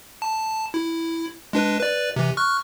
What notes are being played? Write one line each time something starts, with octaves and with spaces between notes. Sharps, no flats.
A5
E4
G#3 D4 B4
B4 D5
C3 E3
C#6 F6 F#6